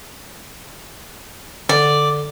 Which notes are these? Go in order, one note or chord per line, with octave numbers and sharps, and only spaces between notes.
D3 D5